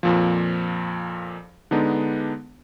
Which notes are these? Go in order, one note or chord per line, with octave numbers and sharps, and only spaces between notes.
F2 A#2 F3
D3 G#3 B3 D4 D#4